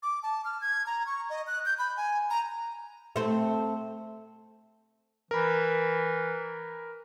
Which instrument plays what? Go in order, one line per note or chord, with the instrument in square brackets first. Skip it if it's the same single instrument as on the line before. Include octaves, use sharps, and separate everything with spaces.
[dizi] D6
A5
F6
G#6
A#5
C#6
D#5
F#6
G6
B5
G#5
A#5
[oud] A3 C4
[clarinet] E3 [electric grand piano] A#4 B5